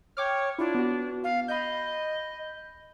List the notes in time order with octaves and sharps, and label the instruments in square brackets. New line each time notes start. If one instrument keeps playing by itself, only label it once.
[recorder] C#5 [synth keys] G5 D6 F6
[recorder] D4 [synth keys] E4 F4
[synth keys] B3 F#4
[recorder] F5
[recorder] D#5 [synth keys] B5 G6